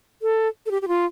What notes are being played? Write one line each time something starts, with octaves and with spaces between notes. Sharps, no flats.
A4
A4
G4
G4
F4